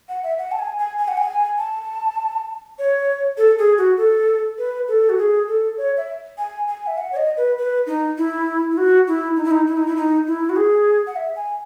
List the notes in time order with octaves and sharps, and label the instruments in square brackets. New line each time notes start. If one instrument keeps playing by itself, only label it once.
[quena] F#5
E5
F#5
A5
G#5
G#5
G#5
F#5
G#5
A5
C#5
A4
G#4
F#4
A4
B4
A4
F#4
G#4
A4
C#5
E5
G#5
G#5
E5
F#5
C#5
D#5
B4
B4
D#4
E4
E4
F#4
E4
D#4
E4
D#4
E4
D#4
E4
D#4
E4
F#4
G#4
F#5
E5
G#5